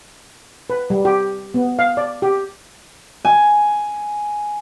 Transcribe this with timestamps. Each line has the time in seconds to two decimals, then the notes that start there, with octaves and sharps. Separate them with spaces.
0.70 B4
0.90 G3
1.05 G4
1.54 B3
1.79 F5
1.97 D5
2.22 G4
3.25 G#5